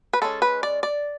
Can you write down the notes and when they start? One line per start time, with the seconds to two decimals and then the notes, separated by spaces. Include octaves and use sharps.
0.13 B4
0.22 G#3 C#4 A4
0.42 B4
0.63 D5
0.83 D5